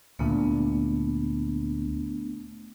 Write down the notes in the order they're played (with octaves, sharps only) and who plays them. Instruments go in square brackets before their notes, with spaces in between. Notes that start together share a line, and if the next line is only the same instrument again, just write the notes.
[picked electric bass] D2 A#2 [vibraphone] A3 B3 D4